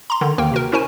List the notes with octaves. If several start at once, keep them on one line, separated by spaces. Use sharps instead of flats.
A#5 C6
D3 D#3
D#2 D#3 A#3 A#4 G5
C3 F#4 A#4
C#4 E4 F#4 A#4 C5 G#5